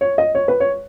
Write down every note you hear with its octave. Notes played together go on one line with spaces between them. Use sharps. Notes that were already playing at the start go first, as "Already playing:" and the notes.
C#5
D#5
C#5
B4
C#5